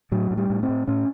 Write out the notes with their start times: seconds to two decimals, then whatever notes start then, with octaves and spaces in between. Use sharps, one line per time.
0.12 A2 F#3
0.31 A2
0.38 G3
0.50 A2
0.63 C4
0.69 A2
0.88 A2 C#4